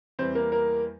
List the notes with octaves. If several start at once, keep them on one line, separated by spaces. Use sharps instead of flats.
E2 E3 G3 C4 C5
A#3 A#4
A#3 A#4